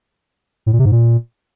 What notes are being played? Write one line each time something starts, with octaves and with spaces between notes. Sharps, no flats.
A2
A#2
C3
G#2
A#2